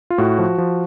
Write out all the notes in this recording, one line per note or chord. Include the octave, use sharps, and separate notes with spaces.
F4
A2 F#4
F3
F3